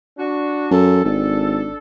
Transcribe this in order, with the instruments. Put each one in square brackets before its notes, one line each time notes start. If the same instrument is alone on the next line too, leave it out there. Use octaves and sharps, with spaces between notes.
[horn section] D4 F#4
[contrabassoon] F#2 [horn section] A4
[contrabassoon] G#1 [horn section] D4 A4